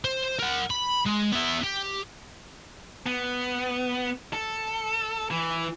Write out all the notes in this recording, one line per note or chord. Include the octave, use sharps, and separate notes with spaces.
C5
A#4 F#5
B5
G#3
B3 E4
G4
B3
A4
E3